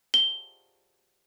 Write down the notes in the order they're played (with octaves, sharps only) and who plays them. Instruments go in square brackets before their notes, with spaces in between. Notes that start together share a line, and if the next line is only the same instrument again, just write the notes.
[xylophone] G7